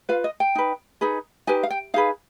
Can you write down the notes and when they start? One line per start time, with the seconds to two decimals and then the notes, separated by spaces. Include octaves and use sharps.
0.09 F4 B4 F5
0.24 D#5
0.40 G5
0.55 D#4 B4
1.01 D#4 G#4 B4
1.47 D#4 G4 B4 G#5
1.63 F5
1.70 G5
1.94 D#4 G#4 B4 F5